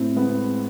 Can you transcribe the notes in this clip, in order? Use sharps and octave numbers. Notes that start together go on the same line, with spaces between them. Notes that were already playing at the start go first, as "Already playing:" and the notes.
Already playing: A2 C4
G#3 B3